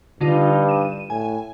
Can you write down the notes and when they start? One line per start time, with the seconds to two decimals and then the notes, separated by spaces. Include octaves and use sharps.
0.21 G2 D3 D#4 F4
0.69 D#7 E7
1.10 A2 G#5